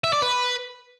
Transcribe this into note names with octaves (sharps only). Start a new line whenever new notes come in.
E5
D5
B4